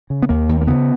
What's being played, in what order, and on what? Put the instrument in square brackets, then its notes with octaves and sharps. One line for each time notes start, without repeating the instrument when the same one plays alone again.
[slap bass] C#3
B3
D#2 A#3
D#2
A#3
C#3 B3